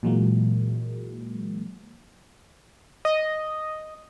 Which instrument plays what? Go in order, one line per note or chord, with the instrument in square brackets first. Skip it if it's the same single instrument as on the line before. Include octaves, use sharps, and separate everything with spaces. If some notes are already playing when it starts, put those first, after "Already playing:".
[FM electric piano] A#2 E3 F#3 G#3 A#3
[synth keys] D#5